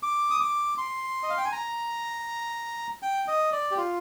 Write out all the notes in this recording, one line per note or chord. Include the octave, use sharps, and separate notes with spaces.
D6
D#6
D6
C6
D#5
F5
G5
G#5
A#5
G5
D#5
D5
G4
F4